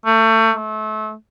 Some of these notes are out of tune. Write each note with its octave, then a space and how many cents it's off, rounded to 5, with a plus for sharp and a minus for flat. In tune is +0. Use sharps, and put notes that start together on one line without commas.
A3 +30
A3 -30